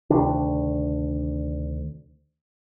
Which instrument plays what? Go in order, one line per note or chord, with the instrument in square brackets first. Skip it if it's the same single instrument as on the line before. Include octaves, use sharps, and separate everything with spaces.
[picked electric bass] D2 C3 D#3 D4